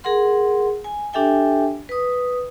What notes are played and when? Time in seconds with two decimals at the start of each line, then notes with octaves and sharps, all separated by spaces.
0.04 G#4 A#4 F#5 C6
0.84 G#5
1.13 D4 G4 A4 E5 G5 G#5
1.89 B4 D#6